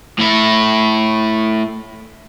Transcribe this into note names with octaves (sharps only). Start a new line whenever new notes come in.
A2 E4